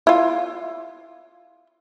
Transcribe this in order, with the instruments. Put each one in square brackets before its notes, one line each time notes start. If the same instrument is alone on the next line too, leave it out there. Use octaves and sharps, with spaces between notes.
[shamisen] E4 F4